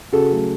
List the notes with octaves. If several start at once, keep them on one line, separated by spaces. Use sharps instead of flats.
C#3 F#4 A4
F#3 A3